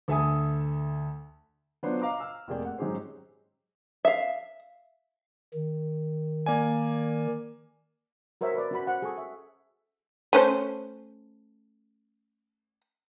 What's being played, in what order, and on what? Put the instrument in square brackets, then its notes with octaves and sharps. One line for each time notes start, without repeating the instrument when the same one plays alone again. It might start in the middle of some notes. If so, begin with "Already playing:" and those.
[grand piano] D2 A4 E5 G#5 D#6
F#3 B3 D4 F4 C5 C#5
D#5 F5 A#5 D6
E6 F6
F1 A#3 G#4 D5 G5
F#5
G#2 F#3 D#4 G4 G#4 C5
[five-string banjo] E5 F5
[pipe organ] D#3
[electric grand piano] A#3 D5 G#5
[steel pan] F#4 A#4 C5 C#5 E5
B4 D5
C#4 F#4 B5
C5 F#5
G#4 A4 C#6
E5
[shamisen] A3 C#4 C5